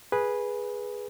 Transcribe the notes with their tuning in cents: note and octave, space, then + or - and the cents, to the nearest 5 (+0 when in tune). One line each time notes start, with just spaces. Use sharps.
G#4 +0 B4 -10